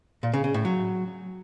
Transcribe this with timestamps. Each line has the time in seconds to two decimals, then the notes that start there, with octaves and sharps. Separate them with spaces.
0.23 A#2
0.33 C#3
0.44 C#3
0.54 A2
0.65 F#3